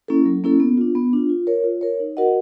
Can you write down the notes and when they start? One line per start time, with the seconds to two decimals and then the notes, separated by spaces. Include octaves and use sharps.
0.08 A#3 C#4 E4 A4
0.25 F#3
0.44 A#3 C#4 E4 A4
0.60 B3
0.77 D4 F4
0.95 B3
1.13 D4 F4
1.29 F4
1.47 A#4 C#5
1.64 F4
1.81 A#4 C#5
2.00 D#4
2.17 F#4 A#4 D#5 F#5